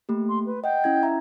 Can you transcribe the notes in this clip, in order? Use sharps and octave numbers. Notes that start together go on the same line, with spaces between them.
A3 A#3 G4
C6
B4
D#5 F#5 G5
C#4 E4 G#6
E5 A#5